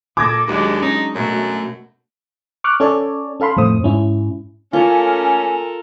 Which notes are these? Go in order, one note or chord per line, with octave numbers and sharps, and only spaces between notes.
A#2 A4 D6 G#6 A#6
D#2 F#3 G#3 D4
C#4 D#4
F#2 B2 A3 F#4
C#6 D6 F6 F#6
C#4 A4 C#5 D5
C#4 A4 F5 B5 C6
F2 A2 A3 C5 D#6
G#2 C#4 E4
A3 A#3 C#4 F4 A4 A#4 G#5